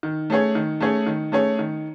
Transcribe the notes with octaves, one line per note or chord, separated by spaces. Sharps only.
D#3
A3 C#4 G#4 C#5
D#3
A3 C#4 G#4 C#5
D#3
A3 C#4 G#4 C#5
D#3